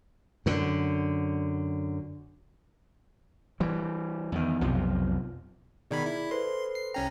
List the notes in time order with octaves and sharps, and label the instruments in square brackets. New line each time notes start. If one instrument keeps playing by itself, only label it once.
[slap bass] F#2 D3
E3 G3
E2 D#3
B1 F2 C3 F3
[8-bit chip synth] B2 D#3 B5 [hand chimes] G#4 D5 G#6
[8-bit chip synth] E4
[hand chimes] A4 B4 C5 [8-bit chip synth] C6
[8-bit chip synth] C7
[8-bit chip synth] C2 C#4 A#5 [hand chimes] G5